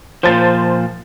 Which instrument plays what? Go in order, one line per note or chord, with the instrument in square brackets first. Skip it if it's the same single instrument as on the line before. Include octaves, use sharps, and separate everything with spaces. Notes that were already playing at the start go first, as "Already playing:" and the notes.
[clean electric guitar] A#2 F3 [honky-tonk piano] C5 A5 A6